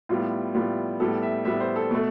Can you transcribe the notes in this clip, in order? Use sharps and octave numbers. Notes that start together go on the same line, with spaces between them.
A2 G3 B3 F4
A2 G3 B3 F4
A2 G3 B3 A4
E5
A2 G3 B3 E5
C5
A4
B2 A3